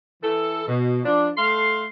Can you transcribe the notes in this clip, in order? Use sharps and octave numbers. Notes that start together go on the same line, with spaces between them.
E3 A4
B2
F3 D4
A3 A4 F5 C6